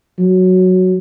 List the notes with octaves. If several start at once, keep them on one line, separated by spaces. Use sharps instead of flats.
F#3